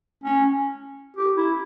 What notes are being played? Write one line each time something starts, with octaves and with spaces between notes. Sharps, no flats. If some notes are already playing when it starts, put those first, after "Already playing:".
C#4
G4
E4